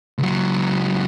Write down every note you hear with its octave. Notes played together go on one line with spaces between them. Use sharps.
C#2 F#3